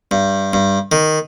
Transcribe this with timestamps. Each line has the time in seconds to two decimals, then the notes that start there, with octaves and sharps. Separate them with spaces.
0.11 G2
0.53 G2
0.92 D#3